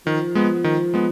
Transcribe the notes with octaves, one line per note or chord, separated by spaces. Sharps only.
D#3 F3
G#3 B3
D#3
G#3 B3